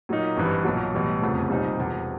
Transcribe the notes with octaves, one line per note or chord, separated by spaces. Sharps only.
A#2 F#3 A#3 D#4
G#1 G2 E3 G3
B1 A#2 F#3
B1 A2 E3 G3
F1 E2 C#3 F3 A3
C2 A#2 G3 C4 D#4
E1 E2 C3 F3